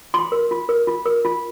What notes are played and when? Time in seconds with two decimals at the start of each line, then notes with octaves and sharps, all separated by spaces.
0.14 F4 C6
0.32 A#4
0.51 F4
0.69 A#4
0.87 F4
1.06 A#4
1.25 F4